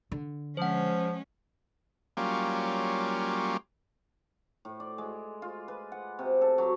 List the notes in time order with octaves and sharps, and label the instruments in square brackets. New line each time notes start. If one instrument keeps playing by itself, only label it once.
[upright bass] D3
[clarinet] F3 [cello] G#3 C#4 [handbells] C5 F#5
[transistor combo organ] F#3 G3 A#3 C#4 F4 G4
[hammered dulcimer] A2
D5
G#3
F4
B4
F#5
C3
A4
F#3